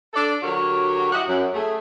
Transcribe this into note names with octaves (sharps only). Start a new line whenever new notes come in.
D4 A4 D5
D3 F#3 F#4 G4 A#4 C#5
E4 F#4 G4 D#5 F#5
F#2
A3 G#4